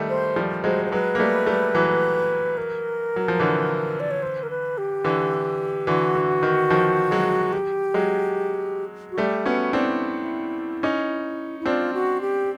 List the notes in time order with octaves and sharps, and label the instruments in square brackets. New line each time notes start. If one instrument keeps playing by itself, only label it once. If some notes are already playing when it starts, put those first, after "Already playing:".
Already playing: [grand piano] D#3 G3 A3
[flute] C5
[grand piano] F3 G3
[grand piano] F#3 G#3 [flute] C5
[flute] C5
[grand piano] F#3 G#3 [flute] B4
[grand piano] A#3
G3 A3
G3 A3
E3 F#3
[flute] A#4
[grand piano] F#3
F3
D3 E3
[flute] D5
C#5
C5
A#4
B4
G4
[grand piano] D3 E3
[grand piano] D3 E3 [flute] F#4
[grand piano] D3
D#3
D#3 F3
F#3 G#3
[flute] G4
[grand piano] F#3 G#3
[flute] F#4
[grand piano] G3 A3 [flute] G4
[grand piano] B3 C#4 [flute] F#4
[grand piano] C4 D4 [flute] E4
[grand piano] C#4 D#4
[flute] E4
[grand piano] C4 D4 [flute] F4
[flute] F#4
G4